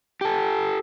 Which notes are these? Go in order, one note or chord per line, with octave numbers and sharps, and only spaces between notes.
G4 A4